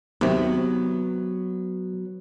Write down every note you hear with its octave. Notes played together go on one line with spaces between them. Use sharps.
D#2 C3 F#3 B3